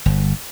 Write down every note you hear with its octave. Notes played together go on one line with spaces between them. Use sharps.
G1